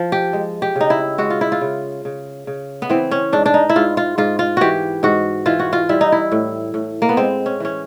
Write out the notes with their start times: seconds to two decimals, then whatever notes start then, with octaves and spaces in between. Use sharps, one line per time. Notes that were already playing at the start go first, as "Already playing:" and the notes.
Already playing: F3
0.12 G4
0.33 G#3
0.62 G4
0.76 C#3 D#4
0.90 E4
1.18 G#3 F#4
1.30 F4
1.41 E4
1.52 F4
1.61 C#3
2.05 C#3
2.47 C#3
2.82 B3
2.90 E3 C4
3.11 C#4
3.32 G#2 D4
3.46 D4
3.54 D#4
3.69 E4
3.76 G#2 F4
3.97 F4
4.18 G#2 F4
4.39 F4
4.57 E3 F#4 G4
5.03 G#2 F#4
5.46 E3 F4
5.59 F#4
5.73 F4
5.89 G3 E4
6.01 D#4
6.12 E4
6.32 A2
6.74 A2
7.02 A#3
7.09 B3
7.17 G#3 C4
7.46 C#4
7.60 E3 C#4